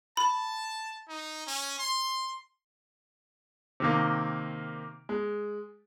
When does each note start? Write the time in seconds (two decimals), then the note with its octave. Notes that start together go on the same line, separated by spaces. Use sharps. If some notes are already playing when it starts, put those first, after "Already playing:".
0.17 A5 B5
1.08 D#4
1.47 C#4
1.79 C6
3.80 C3 D#3 A#3
5.09 G#3